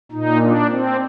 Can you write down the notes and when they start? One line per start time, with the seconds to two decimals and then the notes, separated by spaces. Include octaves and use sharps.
0.12 A#2 D#4
0.41 D4
0.70 C4